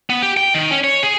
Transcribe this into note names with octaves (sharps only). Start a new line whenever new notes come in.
B3
G4
G5
D#3
C#4
C#5
G#4